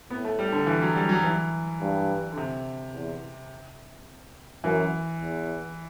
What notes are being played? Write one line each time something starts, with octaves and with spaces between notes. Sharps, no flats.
A2 B3
A3
G3
D3
E3
F#3
G3
F#3
E3
G2
D3
C3
E2
F#2 E3
E2